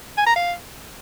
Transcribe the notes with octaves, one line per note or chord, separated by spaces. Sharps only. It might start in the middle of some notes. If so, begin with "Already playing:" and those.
G#5
A#5
F5